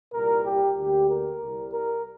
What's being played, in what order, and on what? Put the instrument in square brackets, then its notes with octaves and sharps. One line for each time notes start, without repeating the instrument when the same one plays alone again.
[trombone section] C2 A#2 G3 A#4
G4
D2 D3 A#3 G4
A#4
C2 C3 G3
A#4